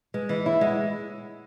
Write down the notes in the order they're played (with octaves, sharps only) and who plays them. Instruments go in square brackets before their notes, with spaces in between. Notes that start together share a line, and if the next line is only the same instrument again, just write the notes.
[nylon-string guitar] G#3 [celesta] B4
[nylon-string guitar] E3 [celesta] B4 D#5
[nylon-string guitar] E4 [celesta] C#5 E5
[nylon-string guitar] G#3 [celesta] D#5 F#5